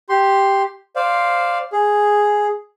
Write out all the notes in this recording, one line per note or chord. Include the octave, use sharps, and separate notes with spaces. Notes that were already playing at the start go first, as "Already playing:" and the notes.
G4 C6
C5 D5 F5
G#4